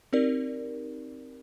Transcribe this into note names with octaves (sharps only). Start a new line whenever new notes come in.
C4 D#4 G4 A#4 D5